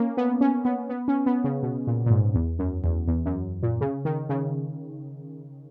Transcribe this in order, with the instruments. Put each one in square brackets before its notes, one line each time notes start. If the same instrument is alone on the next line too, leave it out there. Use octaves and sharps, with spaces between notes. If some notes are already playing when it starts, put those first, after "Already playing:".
Already playing: [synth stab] A#3 C#4
B3
C#4
B3
B3
C#4
B3
C#3
B2
A#2
A#2
G#2
E2
F#2
E2
E2
F#2
A#2
C#3
D#3
C#3